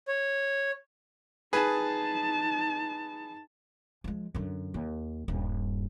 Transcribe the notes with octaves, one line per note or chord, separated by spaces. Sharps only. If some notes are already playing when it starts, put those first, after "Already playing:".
C#5
D#4 G#4 B4 A5
F3 G#3
F#2 D3
D#2
D#1 G2